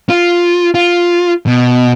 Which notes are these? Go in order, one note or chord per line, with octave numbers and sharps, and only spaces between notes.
F4
F4
B2